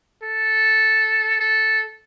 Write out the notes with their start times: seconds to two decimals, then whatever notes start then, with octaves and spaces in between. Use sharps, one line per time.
0.23 A4
1.40 A4